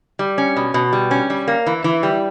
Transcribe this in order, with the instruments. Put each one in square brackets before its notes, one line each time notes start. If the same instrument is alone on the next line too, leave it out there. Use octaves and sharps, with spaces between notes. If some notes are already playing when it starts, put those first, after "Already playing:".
[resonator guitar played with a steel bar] G3
C#4
B2
B2
G3
C#4
G3
A#3
E3
E3
G3